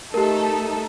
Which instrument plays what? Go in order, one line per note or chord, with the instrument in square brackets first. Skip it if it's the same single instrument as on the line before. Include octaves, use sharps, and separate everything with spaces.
[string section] A3 D#4 A4 [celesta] G4 A#4